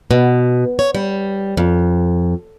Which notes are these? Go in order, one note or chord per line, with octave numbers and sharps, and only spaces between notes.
B2
C#5
G3
F2